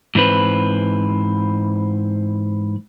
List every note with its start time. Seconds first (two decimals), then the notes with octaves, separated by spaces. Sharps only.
0.15 G#2 E3 C4 B4